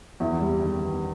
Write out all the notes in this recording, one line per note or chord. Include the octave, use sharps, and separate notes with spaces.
E2 E4
G3
D#3
B3